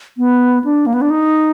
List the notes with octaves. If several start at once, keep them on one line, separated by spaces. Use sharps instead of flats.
B3
D4
A#3
B3
D4
D#4